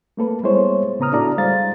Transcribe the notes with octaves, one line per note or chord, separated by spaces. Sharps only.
A3 A#3 A4 B4
G3 G#3 B3 E4 C5 C#5
A2 C#3 B3 A#5 D#6 F6
D4 E4 F#4 A4 D5 A#5
G3 G#3 C5 F5 A6